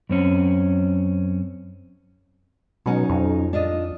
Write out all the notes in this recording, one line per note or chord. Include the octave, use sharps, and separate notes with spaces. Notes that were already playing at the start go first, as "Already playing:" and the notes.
F#2 C4 C#4
B2 F#3 C#4 D#4
F2
D4 F4 D#5